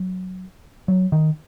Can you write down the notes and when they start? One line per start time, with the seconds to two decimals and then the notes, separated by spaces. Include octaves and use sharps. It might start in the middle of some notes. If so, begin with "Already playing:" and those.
Already playing: F#3
0.88 F#3
1.12 D#3